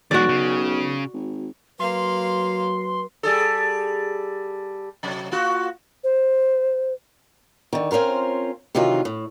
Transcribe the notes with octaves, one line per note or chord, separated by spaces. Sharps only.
B1 E2 G#3 F#4 D5
C#3
G#1
F#3 A#3 B4 F5 C6
G3 G#4 A4
C3 F#3
A#3 F4 F#4
C5
D3 D#3
C4 C#4 F4 A#4 C5
C3 D#3 E3 F#3 D#4 F4
A2